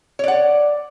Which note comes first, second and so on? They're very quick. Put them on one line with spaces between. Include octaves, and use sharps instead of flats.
C#5 D5 F#5